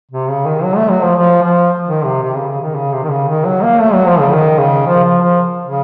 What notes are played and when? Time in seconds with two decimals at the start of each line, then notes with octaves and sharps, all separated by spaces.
0.11 C3
0.29 C#3
0.46 D#3
0.64 F#3
0.77 A3
0.91 F#3
1.03 F3
1.17 F3
1.42 F3
1.88 D#3
2.05 C3
2.22 C3
2.35 C#3
2.49 C#3
2.62 D#3
2.75 C#3
2.93 C3
3.04 D#3
3.10 C#3
3.28 D#3
3.45 F#3
3.63 A#3
3.81 A3
3.94 F#3
4.07 F3
4.20 C#3
4.33 D#3
4.59 C#3
4.87 F3
5.04 F3
5.21 F3
5.65 C#3